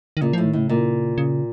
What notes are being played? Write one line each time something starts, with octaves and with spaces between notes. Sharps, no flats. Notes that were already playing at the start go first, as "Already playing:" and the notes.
D#3
A#2 C#3
A2 F3
D#3
A2 C#3
A#2
C#3